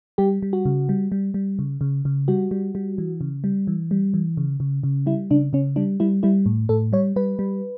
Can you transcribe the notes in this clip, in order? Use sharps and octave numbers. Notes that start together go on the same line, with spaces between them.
G3 G4
G3
F#4
C#3
G3
G3
G3
C#3
C#3
C#3
G3 F#4
G3
G3
E3
C#3
G3
E3
G3
E3
C#3
C#3
C#3
G3 E4
C#3 D4
C#3 C#4
G3 D4
G3 E4
G3 E4
A2
A2 A4
G3 C#5
G3 B4
G3